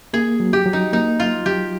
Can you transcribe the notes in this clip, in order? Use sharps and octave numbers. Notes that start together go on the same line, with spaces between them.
A#3 G#4
F#3
G4
F#3
D#4
A#3 D#4
F#3 F4
F#3 G4